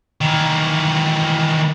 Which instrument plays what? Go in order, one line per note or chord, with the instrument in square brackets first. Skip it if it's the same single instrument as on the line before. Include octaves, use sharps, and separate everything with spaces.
[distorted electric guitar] D#3 E3